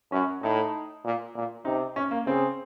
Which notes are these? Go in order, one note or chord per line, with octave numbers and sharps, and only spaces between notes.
F#2 C#4
A2 D#4
A#2
A#2
C3 D#4
C#4
A#3
C#3 C4